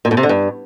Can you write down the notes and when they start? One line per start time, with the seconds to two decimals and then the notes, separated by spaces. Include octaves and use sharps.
0.05 A#2
0.11 A2
0.17 C3
0.23 D3
0.29 G2